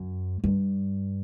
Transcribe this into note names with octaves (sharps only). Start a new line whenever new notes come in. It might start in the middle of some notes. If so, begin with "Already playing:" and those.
Already playing: F#2
G2